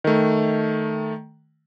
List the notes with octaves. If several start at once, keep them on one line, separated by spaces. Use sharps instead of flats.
D#3 A3